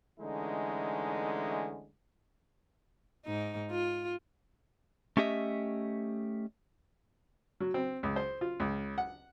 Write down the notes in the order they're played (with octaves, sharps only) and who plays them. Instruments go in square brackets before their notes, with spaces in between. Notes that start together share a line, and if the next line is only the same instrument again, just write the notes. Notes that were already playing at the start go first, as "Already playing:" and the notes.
[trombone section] D3 E3 G#3 A3 C#4 D#4
[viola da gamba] G#2 D#4
F4
[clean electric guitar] A3 C#4 G4 D#5 E5
[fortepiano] F#3
C4
C#2
C5
F4
C#2
F#5